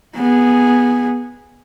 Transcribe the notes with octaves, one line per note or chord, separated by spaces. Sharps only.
B3 G#4